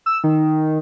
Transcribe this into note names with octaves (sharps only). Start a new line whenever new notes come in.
E6
D#3